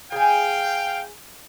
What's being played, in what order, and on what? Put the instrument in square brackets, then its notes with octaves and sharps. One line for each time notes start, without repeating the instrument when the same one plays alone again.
[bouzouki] G#4 G#5 [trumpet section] F5 G5